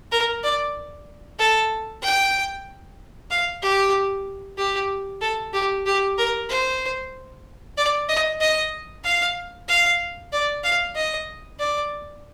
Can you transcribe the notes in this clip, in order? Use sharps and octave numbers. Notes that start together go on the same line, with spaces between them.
A#4
D5
A4
G5
F5
G4
G4
A4
G4
G4
A#4
C5
D5
D#5
D#5
F5
F5
D5
F5
D#5
D5